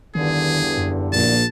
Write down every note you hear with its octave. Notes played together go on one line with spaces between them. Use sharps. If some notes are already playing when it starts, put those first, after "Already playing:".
E2 G2 D3 D#3 G#4
F#2
A#1 A5